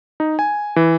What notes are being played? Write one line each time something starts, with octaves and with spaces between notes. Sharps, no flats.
D#4
G#5
E3